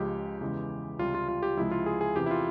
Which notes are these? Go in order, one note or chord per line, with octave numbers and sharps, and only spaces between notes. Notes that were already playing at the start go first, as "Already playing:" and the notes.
Already playing: C#2 C#3 F3 G#3 G4
E2 C#3 E3 G#3
C#2 C3 G3 F4
F4
F4
G4
C#2 C3 F3 G#3 E4
F4
G#4
G#4
E2 C3 E3 G4
E4
F4